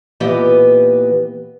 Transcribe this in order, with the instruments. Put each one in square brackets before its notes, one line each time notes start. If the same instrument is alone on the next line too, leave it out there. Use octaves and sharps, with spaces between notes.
[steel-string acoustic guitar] A#2 E3 B3 G4 D#5